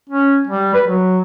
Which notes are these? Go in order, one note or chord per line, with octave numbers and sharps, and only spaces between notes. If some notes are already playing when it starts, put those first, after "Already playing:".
C#4
G3
B4
F#3